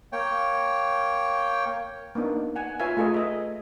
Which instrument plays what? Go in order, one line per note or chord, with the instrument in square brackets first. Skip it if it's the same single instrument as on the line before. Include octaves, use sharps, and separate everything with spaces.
[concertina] A#3 C#5 G5
[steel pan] A#3 B3 D4 D#4
F#5 G#5
F4 B4 C#5 E5 F5 G#5
A3 F4 G#4 A4 B4 D#5
D#5 E5